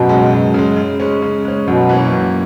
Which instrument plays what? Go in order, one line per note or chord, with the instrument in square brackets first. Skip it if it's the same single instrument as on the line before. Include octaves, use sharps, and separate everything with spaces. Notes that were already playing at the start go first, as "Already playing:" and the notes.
Already playing: [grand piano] F#2 [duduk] B2
[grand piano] C#3 G#3
F#2
C#3 G#3
C#3
G#3 C#4
C#3
G#3 C#4
[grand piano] F#2 [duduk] B2
[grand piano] E3 A#3 C#4
F#2